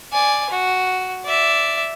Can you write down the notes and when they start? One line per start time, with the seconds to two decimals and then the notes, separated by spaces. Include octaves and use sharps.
0.13 D5 G#5
0.50 F#4
1.25 D5 E5